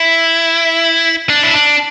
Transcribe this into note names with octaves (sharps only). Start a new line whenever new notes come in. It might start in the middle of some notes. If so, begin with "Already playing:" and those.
Already playing: E4
D4
E4
D4